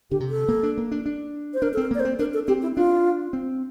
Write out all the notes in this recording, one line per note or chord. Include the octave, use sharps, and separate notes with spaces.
D3 G4
C3
A4
A#3
D4
A#3
D4
D4
C5
D4 A#4
A4
C4 A#4
A#3 D5
C5
C4
D4 A#4
A4
C4 G4
E4
D4 F4
C4